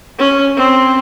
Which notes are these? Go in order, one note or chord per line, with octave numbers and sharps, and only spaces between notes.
C#4
C4